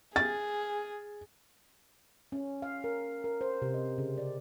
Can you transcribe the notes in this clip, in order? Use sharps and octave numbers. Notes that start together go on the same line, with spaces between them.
G#4 A6
C#4
F5
A#4
A#4
C5
C3
D#5
C#3
D5